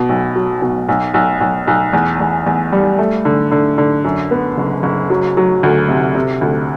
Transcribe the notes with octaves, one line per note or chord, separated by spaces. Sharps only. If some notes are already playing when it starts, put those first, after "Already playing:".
Already playing: B2
B1
F#3
B2
B1
B1
B1
B1
E2
E2
E2
G3
A3
D3
D3
D3
F#2
B3
F#1
F#1
F#3
F#3
D2
C3
C3
D2